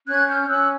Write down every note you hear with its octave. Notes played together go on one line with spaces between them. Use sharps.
C#4 F#6 G#6
F6 G6
C#4 E6 F#6